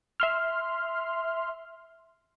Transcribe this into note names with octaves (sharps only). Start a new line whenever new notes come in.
E5 C6 F6